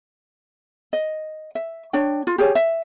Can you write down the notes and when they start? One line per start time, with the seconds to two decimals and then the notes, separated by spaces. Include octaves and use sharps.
0.93 D#5
1.55 E5
1.93 D4 C#5 G5
2.27 F4
2.38 G4 G#4 C#5 G#5
2.55 E5